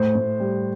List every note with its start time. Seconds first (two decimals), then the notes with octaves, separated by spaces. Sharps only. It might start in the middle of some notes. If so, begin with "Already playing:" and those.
Already playing: A2 C5
0.15 A2
0.40 G3